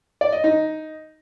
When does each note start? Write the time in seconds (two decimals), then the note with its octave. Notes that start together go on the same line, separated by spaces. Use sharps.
0.21 D5
0.32 D#5
0.44 D#4